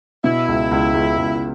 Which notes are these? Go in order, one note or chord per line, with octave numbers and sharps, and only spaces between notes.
B2 E4
C#2
C#2
C#2
C#2